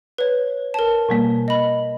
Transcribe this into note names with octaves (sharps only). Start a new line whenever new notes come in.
B4 C#5
A#4 A5
B2 G3 A#3
D#5 B5